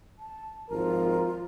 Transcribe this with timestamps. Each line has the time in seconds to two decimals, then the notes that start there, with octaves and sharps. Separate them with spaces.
0.19 A5
0.71 G#1 F3 F4 A#4